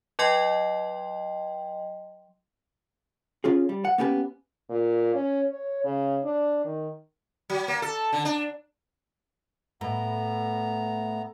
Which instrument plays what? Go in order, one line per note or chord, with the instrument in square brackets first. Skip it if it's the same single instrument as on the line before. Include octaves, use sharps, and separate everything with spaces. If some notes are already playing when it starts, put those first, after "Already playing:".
[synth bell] F#3 D#5 G5 C6
[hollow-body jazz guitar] C#4 F4 G#4
G3
F#5
A#3 B3 C#4 G4 A#4 B4
[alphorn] A#2
C#4
C#5
C#3
D4
D#3
[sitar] F#3
A#3
A4
D3
D4
[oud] A2 [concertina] B3 A#5